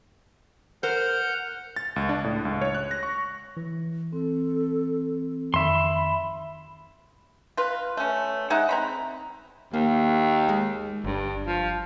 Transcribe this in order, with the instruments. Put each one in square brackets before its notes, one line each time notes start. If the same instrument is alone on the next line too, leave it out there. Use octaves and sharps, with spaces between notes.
[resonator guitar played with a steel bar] A#4 C5 [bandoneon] F#5 F6 G6
[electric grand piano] A6
C#2
D4
A2
C#2
C#5
F#6
A#6
C#6
[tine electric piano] E3
[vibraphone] C4 [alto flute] A4
[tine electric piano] F2 D#3 [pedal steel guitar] E5 C6 [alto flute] B5
[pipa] F4 B4
A3 C#4
G#3 D#4 E5 F#5
C4 A#5 B5
[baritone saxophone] D#2 [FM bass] A#3
[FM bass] G#3
[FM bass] G1 [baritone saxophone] G2
[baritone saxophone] F3